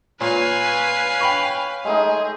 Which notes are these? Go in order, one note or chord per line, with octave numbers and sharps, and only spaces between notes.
A#2 B4 C#5 F5 G#5
G5 B5 C#6
G#3 A3 D#4 G#4